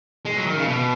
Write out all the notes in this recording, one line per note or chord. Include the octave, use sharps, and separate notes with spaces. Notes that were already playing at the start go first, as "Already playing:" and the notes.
G#3
F#3
D#3
C#3
B2